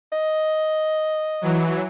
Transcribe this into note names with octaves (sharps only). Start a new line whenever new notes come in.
D#5
E3 F#3